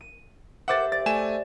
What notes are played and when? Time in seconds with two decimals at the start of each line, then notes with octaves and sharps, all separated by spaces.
0.01 D#7
0.68 G4 C5 E5 F#5 D6 A6
0.92 D5 A6
1.06 A3 G#5 E7